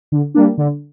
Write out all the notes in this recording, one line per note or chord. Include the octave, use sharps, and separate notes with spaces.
D3
G3 A#3 D4
D3